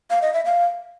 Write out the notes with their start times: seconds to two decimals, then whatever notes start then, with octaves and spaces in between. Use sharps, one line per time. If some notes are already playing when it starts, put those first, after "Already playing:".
0.10 F5
0.22 D#5
0.34 E5
0.45 F5